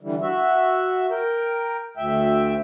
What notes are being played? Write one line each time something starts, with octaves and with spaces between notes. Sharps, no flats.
D3 E3 G3
F#4 E5
A#4 G5
D2 E5 G5